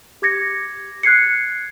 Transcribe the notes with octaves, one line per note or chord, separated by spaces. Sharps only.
G4 D6 G#6 A#6 C#7
F#6 G#6 C7 C#7